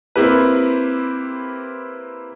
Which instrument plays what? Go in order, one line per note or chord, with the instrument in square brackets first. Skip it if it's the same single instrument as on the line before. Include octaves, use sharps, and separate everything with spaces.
[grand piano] A#3 C4 E4 G4 B4